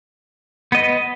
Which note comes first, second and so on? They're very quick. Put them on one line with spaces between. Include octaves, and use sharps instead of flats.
B3 D#5 B4